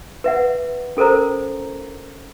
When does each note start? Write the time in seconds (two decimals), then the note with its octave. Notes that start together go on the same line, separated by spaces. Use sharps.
0.24 B4 E5 F#5
0.97 C#4 A4 A#4 C5 A#5